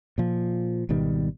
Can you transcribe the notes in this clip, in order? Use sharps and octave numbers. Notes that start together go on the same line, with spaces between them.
A#2 F3
G#1 B2 D#3 G3